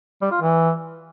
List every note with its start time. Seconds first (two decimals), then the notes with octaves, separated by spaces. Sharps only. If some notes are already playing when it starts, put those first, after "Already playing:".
0.22 G3
0.31 F4
0.41 E3